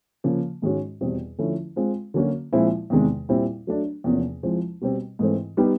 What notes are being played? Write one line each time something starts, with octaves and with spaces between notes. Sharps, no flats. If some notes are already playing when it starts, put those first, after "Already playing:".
C#3 F3 A#3
G#2 D#3 G#3 C#4 F#4
E2 B2 G3 C4
D3 F3 A3 C#4 E4
G#3 C4 F4
D3 F#3 A#3 C#4 F#4
A#2 F3 G#3 C4 E4
E2 C3 D#3 G#3
A#2 G3 C4 E4
F#3 A3 D4
E2 C3 F3 A#3 C#4
F3 G#3 C4 E4
B2 G3 C4
G#2 E3 A3 C4
G3 B3 D#4 G4